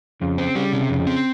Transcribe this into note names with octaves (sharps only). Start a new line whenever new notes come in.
F2 C#3
C4
C#3 G3
C3
F2
C4